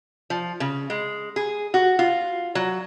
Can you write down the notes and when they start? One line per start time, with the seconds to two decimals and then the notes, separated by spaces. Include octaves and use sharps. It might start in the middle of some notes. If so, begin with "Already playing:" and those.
0.30 F3
0.60 C#3
0.90 G#3
1.36 G#4
1.74 F#4
1.99 F4
2.55 F#3